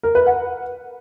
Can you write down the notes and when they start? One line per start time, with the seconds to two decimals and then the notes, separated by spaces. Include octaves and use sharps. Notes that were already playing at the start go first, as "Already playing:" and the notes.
0.03 A#4
0.15 B4
0.26 F#5